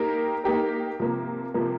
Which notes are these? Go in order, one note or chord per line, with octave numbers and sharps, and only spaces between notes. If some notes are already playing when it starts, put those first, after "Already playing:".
Already playing: A#3 D#4 G4 A#4
A#3 D#4 G4 A#4
C3 F3 A#3
C3 F3 A#3